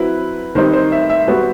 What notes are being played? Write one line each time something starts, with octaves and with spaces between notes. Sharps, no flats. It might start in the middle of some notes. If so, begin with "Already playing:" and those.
Already playing: F#3 C4 E4 B4
D#3 G3 C4 D#4 C5
C5
E5
E5
G3 B3 F#4